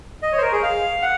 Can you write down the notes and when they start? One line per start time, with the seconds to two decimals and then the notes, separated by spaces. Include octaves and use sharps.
0.23 D#5
0.32 C#5
0.38 C5
0.42 A#4
0.52 G#4
0.63 F5
1.02 F#5